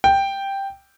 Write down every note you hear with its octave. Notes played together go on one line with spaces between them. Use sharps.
G5